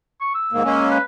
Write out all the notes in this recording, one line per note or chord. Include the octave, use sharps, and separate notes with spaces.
C#6
E6
G#2 D#3 A#3
G#3 A#3 C#4
B4